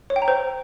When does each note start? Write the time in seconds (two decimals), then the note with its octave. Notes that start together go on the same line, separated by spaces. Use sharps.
0.10 C#5
0.16 G5
0.22 A#5
0.28 C5